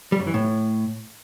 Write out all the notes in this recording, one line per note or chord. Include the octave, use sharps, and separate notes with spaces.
G3
F#2
E3
A2